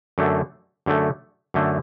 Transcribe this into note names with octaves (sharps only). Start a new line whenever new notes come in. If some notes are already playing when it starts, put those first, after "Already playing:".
F#2 D3 A3
F#2 D3 A3
F#2 D3 A3